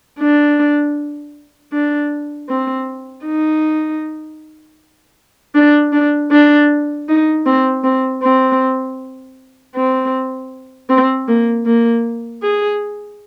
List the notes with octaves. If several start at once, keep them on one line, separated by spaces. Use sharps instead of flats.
D4
D4
C4
D#4
D4
D4
D4
D#4
C4
C4
C4
C4
C4
A#3
A#3
G#4